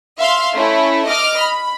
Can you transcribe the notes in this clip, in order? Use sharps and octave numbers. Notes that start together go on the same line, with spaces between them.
E5 F5 C6
A3 C#4 E4
D#5 D6 F6
B5